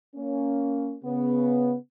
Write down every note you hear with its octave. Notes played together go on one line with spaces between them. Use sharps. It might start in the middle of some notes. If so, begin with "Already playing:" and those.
A#3 C#4
C#3 B3